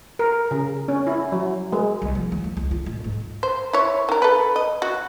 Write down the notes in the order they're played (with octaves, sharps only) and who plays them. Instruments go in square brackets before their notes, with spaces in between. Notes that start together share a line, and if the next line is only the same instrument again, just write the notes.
[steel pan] A#4
C#3
C#4
E4
F#3
G#3
[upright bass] C2
F3
D#2
E2
C#2
F4
D1
G#2
[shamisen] C5
E4 C#5
D#3 A#4
A4 B4
D#5
F#4